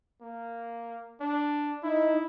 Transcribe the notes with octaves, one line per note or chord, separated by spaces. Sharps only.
A#3
D4
D#4 E4